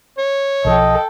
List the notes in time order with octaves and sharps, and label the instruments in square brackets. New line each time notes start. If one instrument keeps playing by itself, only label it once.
[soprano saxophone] C#5
[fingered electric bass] B1 D#3 F3 [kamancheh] A4 G5 [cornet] D#5